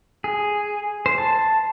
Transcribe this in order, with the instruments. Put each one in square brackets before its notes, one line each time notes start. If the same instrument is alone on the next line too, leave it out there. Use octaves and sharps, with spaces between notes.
[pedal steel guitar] G#4
C5
A5